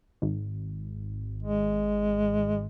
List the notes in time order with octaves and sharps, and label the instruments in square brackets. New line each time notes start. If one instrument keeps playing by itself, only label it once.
[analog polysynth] G#1
[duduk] G#3